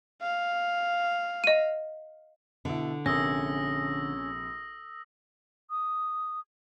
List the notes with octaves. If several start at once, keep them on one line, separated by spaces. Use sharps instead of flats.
F5
D#5 D#7
B2 D3 E4
A#1 C3 C#4 A#4 D#6 E6 A#6
D#6